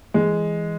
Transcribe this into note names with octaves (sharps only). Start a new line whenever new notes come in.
E3 G#3